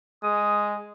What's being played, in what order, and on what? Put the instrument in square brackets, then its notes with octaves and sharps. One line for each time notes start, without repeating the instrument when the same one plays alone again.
[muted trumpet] G#3 [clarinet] D#6